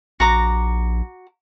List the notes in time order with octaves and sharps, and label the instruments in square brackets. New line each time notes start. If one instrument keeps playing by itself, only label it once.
[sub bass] A#1 [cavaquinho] F#4 A#5 D6